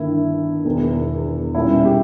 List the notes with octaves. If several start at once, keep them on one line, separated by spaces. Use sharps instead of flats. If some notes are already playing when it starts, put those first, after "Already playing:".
Already playing: G1 G2 D#3 A#3 E4
E1 E2 D#3
B1 A#2 G3 C#4 E4
G4